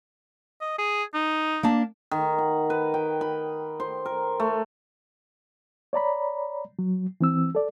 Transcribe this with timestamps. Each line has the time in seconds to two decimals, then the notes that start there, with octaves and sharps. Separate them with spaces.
0.61 D#5
0.79 G#4
1.14 D#4
1.63 A#3 D4 A5
2.11 D#3
2.38 F#5
2.70 B4
2.94 G5
3.21 B5
3.80 C5
4.06 A#4
4.40 A3
5.93 C#5 D5 A#5 B5
6.79 F#3
7.21 E3 C4 E6
7.55 A4 D5